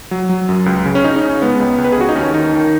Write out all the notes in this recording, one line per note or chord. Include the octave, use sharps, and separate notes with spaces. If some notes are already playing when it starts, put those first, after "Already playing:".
F#3
F#3
F#2
C#2
C#3
C#4
C#3 D#4
D#4
C#3
C#4
G#3 B3
C#2
C#2
B4
G#4
C#3 F#4
D#4
D#2 C#4
D#3 D#4
D#3